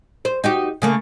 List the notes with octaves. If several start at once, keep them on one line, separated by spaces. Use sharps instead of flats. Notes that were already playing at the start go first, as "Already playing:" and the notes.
C5
D#4 F#4 G4
C#3 A3 A#3